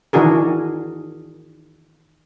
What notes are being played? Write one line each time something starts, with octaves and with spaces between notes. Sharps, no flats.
D#3 E3 D4 F#4 G#4 A#4